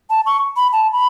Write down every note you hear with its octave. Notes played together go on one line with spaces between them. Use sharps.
A5
C#6
B5
A5
B5